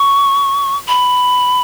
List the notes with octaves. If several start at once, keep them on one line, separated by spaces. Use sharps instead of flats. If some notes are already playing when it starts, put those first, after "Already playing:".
Already playing: C#6
B5